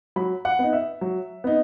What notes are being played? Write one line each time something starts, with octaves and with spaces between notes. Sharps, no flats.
F#3 B5
F#5
B3 D#4
E5
F#3
B3 D#4